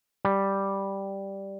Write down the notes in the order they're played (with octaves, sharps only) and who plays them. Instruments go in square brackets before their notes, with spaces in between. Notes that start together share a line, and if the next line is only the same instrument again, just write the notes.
[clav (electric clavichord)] G3